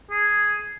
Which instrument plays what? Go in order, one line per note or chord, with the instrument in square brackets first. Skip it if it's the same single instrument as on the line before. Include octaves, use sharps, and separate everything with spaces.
[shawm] G#4